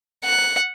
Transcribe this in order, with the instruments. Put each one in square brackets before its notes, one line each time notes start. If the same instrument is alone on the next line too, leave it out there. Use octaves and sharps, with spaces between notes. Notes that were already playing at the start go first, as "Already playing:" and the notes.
[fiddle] F#5